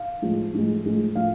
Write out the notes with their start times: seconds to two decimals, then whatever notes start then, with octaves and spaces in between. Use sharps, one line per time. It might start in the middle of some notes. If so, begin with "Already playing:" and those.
Already playing: F5
0.22 A2 F3 G#3
0.54 A2 F3 G#3
0.86 A2 F3 G#3
1.15 A2 F3 F5